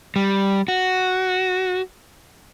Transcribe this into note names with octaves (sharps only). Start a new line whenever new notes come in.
G3
F#4